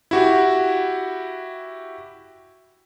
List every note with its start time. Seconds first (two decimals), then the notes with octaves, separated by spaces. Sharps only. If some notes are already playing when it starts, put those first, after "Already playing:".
0.11 E4 F#4 G4